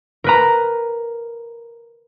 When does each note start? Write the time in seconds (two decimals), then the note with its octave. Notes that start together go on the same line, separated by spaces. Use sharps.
0.24 A#4 B4 A#5